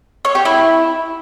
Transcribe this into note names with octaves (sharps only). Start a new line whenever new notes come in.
C#5
G4
E4